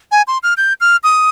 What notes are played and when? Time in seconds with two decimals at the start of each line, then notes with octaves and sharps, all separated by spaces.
0.12 G#5
0.27 C6
0.43 F6
0.57 G6
0.81 F6
1.04 D#6